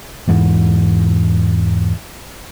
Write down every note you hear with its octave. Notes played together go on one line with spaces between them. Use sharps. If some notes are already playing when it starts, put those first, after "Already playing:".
E2 G#2 E3